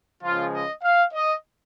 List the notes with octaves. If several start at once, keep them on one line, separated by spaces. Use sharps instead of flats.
C#2 C#3 F3 G#3 F4
D#5
F5
D#5